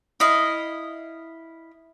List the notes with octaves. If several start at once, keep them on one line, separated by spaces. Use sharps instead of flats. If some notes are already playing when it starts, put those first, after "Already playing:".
E4 D#5 F5